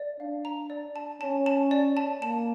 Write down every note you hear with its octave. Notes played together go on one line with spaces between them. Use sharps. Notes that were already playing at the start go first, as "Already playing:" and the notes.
Already playing: D5
D4 F5
A#5
D5
A5
C#4 A5
A5
D5
A5
A#3 A5